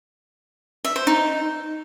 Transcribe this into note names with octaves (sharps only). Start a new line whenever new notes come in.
E5
C5
D#4